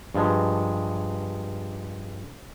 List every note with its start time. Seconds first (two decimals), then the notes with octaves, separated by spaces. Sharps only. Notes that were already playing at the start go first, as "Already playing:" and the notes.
0.15 G2 F3 G#3